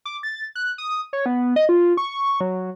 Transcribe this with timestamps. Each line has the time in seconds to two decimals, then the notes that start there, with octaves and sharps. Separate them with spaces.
0.05 D6
0.23 A6
0.55 F#6
0.78 D#6
1.13 C#5
1.26 B3
1.56 D#5
1.69 F4
1.97 C#6
2.41 F#3